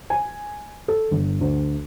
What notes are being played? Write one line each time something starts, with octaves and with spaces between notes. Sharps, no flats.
G#5
A4
G1
D2